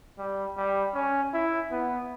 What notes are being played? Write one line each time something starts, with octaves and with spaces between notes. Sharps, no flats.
G3
G3
C#4
E4
B3